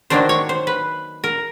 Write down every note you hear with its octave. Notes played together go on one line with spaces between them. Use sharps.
D#3 F#3 A#3 D4 C5
C#5
C5
B4
A#4